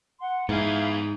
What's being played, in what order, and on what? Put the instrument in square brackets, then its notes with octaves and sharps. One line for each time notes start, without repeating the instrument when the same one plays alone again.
[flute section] F#5 C6
[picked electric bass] G#2 [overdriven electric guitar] B3 G#4 [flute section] E4 F5 F6